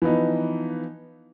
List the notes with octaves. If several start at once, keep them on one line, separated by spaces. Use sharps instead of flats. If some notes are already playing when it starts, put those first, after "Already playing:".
E3 F3 B3 D#4